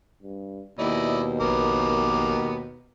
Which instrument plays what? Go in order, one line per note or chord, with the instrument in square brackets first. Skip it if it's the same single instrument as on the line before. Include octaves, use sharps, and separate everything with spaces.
[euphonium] G2
[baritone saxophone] D#2 [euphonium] B2 [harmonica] E4 D5 D#5
[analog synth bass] A#1 [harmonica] B3 A#4 D6